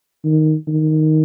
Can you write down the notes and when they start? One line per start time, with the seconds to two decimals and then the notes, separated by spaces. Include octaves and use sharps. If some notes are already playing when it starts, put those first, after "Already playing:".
0.24 D#3
0.68 D#3